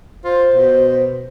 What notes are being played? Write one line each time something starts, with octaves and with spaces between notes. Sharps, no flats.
F4 C5
B2